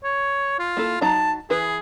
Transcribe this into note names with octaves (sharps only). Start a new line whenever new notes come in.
C#5
F4
A#3 E4 A4
F#3 D#4 A5 A#5
E3 G#4 B4